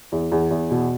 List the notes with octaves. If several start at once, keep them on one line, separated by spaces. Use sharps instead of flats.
E2
E2
E2
B2